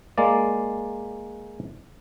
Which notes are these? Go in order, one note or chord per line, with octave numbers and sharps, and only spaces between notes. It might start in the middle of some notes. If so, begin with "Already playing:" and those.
G#3 A#3 D5